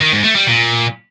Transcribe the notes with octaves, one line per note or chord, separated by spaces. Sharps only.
D#3
G#2
A3
G3
A#2